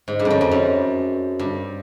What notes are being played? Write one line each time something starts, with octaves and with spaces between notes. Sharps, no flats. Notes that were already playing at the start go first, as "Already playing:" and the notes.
G#2
G2
F2
F#2
F2
F#2
G2